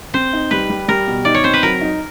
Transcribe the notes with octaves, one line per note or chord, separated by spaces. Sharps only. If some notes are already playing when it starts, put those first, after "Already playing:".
C4 C5
D#4
G3 B4
G3
G3 A#4
B2
D#4 D5
C#5
C4 C5
B4
F#3 A#4
D#4